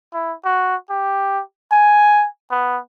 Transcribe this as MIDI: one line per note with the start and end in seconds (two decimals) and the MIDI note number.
0.14 0.33 64
0.45 0.75 66
0.90 1.41 67
1.72 2.26 80
2.51 2.78 59